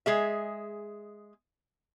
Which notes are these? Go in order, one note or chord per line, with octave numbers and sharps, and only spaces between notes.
G#3 G#4 E5